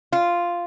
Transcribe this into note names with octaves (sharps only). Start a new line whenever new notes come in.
F4